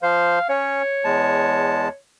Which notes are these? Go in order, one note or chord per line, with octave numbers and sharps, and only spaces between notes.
F3 C5 F5
C#4 C#5
E2 G#3 A5